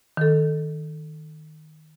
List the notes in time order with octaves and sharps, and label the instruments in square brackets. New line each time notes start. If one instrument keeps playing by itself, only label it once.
[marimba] D#3 A4